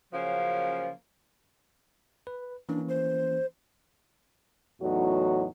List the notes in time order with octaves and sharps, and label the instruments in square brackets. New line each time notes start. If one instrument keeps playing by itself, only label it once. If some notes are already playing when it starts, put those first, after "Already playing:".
[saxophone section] C#3 F3 F#3 A#3 C#4
[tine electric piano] B4
[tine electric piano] E3 A#3 C#4 [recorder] D4
[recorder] C5
[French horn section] E2 A2 F#3 D#4 F#4